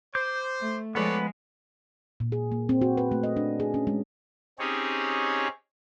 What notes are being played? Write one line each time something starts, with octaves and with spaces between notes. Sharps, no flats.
C5 D6 G6
A3
F3 G#3 B3 A4 B4 C#5 D5
A#2
G#4
A#3
C4
F#4
B4
A3
D#5
D4
G#4
C#4
G#3
C4 C#4 D#4 G4 G#4 C#5